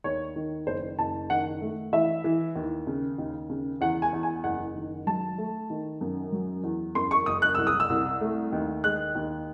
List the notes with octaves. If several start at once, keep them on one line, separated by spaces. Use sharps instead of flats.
D#2 C#5
D#3
F#1 C5
F#1 A5
D#3 F#5
A3
E3 E5
E3
D#2
C#3
D#2
C#3
E2 F#5
G#5
E2
G#5
F#1 F#5
D#3
F#3 A5
A3
D#3
F#2
F#3
E2
F#2 C6
C#6
F#1 D#6
F#6
C2 E6
D#6
E6
C2
A3
D#2
G#3 F#6
D#2